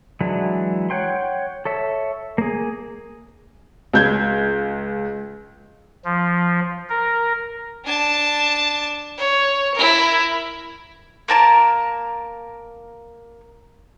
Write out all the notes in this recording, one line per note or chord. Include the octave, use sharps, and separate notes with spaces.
E3 F#3 G#3 D4 E4
C#5 F#5 G5 C6
A4 C#5 E5
A#3 G#4
C#2 G6 G#6
F3
A#4
D4 A5
C#5
E4 A#4
A#3 A#4 A5 A#5